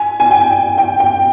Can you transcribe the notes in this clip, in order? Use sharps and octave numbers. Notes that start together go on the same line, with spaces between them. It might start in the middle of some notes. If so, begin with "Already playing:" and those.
Already playing: G#5
G#5
G5
G5
G5